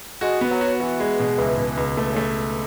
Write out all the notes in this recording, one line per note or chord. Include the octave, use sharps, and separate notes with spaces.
G#3 F#4
B3
F#3
F#4
E3 F#4
G#3
B2
C#2 E3
B2
C#2
E3 A3
C#3 A3